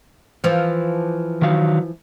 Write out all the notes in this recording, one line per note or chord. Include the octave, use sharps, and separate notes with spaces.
E3 F3
D#3 F#3 F5